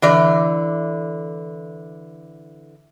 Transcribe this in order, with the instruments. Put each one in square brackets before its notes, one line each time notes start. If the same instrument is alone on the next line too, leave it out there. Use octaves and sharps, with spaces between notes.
[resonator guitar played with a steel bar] D3 E3 D5